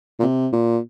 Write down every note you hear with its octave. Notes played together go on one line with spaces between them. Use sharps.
A#2
C3
A#2